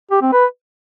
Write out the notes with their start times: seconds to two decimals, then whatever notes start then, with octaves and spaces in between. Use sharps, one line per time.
0.11 G4
0.22 C4
0.33 B4